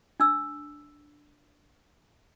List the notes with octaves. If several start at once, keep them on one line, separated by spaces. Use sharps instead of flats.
D4 E6